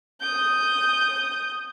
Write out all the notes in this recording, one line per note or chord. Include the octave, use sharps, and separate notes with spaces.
D#6 G6